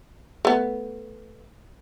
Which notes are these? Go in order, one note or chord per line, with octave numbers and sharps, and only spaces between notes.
A3 B3